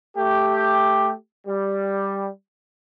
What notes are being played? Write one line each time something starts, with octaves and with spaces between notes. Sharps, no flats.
A3 G4
G3